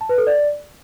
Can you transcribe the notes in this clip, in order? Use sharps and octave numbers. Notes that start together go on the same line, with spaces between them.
A5
B4
A4
D5